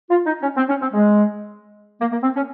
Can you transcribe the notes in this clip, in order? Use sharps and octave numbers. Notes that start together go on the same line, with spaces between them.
F4
D#4
C#4
C4
C#4
C4
G#3
A#3
A#3
C4
C#4